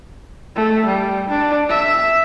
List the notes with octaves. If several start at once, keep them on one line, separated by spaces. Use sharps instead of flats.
A3
G3
D4
E5